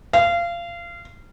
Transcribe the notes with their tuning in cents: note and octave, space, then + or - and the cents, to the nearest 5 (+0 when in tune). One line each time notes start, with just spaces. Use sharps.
F5 -25